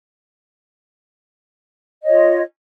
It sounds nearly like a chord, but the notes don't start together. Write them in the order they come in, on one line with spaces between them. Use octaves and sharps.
D#5 C#5 F4